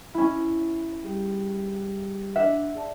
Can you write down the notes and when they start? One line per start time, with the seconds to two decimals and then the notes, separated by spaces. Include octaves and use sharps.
0.14 C#4 E4
1.03 G3 G4 G#4
2.36 D4 E5 F#5
2.74 G#4 D5 A5